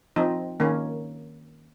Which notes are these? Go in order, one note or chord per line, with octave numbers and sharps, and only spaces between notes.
F3 C4 D#4
D#3 A#3 C#4